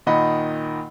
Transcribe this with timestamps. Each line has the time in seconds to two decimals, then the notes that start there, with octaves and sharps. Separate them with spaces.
0.06 A#2 D#3 D#5 F#5 B5